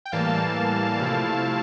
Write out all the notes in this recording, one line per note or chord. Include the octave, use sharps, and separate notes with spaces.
G5
A2 E3 G3 A#3 F5 A5
C3 F3 A3 E4